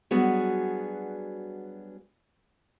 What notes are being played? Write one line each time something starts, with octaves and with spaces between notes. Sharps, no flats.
F#3 G3 B3 D4 F#4 G#4